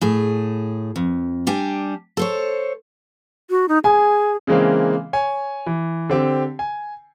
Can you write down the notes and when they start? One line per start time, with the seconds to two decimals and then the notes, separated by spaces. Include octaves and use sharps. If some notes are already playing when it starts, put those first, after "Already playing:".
0.01 A2 G#4
0.96 F2
1.47 G3 D4 G4 G#5
2.17 A4 C5 C#5
3.50 F#4
3.69 D#4
3.84 G#4 G#5
4.47 C#3 E3 G#3 A#3 C4
5.13 C#5 G#5
5.66 E3
6.10 D3 C4 G4
6.59 G#5